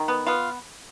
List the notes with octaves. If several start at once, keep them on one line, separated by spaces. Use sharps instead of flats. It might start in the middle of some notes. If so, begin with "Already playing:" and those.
Already playing: D#3
B3
B3 F4